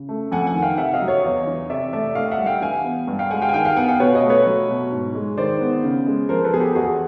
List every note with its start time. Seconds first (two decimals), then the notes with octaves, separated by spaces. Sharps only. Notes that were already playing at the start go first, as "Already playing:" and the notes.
Already playing: C#3
0.09 A3
0.32 F2 F#5 G#5
0.47 F#5 G#5
0.54 D#3
0.62 F5 G5
0.77 C3 E5 F#5
0.94 D#5 F5
1.01 F#3
1.08 C#5 D#5
1.24 E2
1.47 E3
1.70 C3 D5 E5
1.93 A3 D5 E5
2.15 A2 D#5 F5
2.31 E5 F#5
2.38 G3
2.46 F5 G5
2.61 E3 F#5 G#5
2.84 B3
3.07 G2
3.19 F5 G5
3.30 G#3 F#5 G#5
3.42 F5 G5
3.49 G#5
3.53 D#3 F5 G5
3.65 F5 G5
3.76 B3 F#5 G#5
3.88 F5 G5
4.00 B2 B4 C#5
4.14 C#5 D#5
4.23 A3
4.30 B4 C#5
4.46 F#3
4.69 B2
4.91 G#2
5.15 G#3
5.37 D#3 C5 D5
5.61 B3
5.84 C#3
6.06 G#3
6.29 F3 A#4 C5
6.44 A4 B4
6.53 B3 G#4
6.60 G4 A4
6.75 E2 F#4 G#4